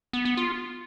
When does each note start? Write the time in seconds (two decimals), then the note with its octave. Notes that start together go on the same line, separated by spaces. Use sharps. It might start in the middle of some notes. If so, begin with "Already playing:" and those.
0.13 B3
0.25 B3
0.37 F4